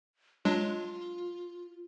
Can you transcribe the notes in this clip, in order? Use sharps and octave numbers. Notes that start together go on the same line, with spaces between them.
F#3 G#3 D4 F4